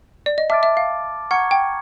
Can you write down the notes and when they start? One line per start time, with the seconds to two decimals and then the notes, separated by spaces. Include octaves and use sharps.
0.26 D5
0.38 D#5
0.50 E5 A5 D6 F6 A6 D7
0.63 E5
0.77 F5
1.31 F#5 A#5 C#6 F6 G#6 C#7
1.51 G5